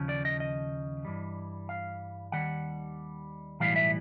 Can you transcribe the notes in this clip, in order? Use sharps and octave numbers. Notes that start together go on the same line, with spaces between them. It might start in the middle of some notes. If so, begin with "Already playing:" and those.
Already playing: D#2 C#3 F3
D5
D#5
D#5
G2 E3 G3
F5
D#2 D#3 G3 F#5
B1 A2 E3 G3 F5
E5